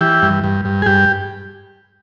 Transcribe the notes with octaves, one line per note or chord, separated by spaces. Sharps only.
E3 G4
G2
G2
G2
G#4
G2 G4